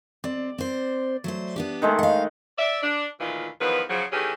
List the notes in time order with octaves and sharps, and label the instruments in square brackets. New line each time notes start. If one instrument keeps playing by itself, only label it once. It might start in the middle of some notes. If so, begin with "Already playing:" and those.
[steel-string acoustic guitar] C4 [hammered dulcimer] D5
[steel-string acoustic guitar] C4 C5
F#3 A3 C5
B3 D4 G4
[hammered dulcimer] D#3 G#3 A3
[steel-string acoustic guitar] F5 F#5
[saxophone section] D5 E5
D4
D2 A#2 D#3 E3 F4
E2 D#3 F3 F#3 B4
C#3 F3 F#3
D#3 E3 A3 C#4 G4 G#4